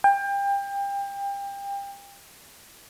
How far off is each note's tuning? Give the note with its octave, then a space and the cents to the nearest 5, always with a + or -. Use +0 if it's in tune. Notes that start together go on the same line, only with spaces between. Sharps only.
G5 +30